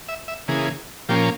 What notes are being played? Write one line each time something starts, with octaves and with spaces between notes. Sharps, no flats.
E5
E5
C#3 E3 A#3 G#4
A#2 F3 A#3 C#4 G4